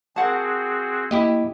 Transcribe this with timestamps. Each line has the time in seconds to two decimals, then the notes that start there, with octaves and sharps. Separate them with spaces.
0.16 C4 F#4 G#4 A#4 F#5 A5
1.11 A#3 E4 G4 D#5